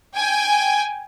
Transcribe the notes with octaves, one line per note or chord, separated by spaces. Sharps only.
G5 G#5